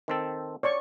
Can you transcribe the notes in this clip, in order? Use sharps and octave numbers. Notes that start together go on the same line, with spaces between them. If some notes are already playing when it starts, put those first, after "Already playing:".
D#3 C4 A4
C#5 D5 C#6